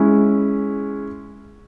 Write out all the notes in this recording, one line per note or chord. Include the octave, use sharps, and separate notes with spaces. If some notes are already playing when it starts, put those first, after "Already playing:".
Already playing: G#3 C#4 E4